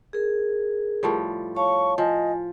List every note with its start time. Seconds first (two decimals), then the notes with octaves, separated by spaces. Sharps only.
0.13 G#4 A#4
1.03 A2 F3 G3
1.56 C#5 F5 A5 C#6
1.98 F3 D#5 G#5